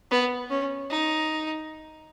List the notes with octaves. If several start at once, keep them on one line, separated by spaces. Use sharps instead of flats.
B3
C#4
D#4